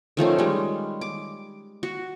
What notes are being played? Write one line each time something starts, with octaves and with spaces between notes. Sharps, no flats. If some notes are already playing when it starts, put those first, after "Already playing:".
D#3 F3 A3 C#4
G3 G#3
D6
F#4